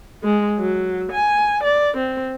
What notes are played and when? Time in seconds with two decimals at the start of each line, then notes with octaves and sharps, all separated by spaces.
0.23 G#3
0.59 F#3
1.12 G#5
1.64 D5
1.97 C4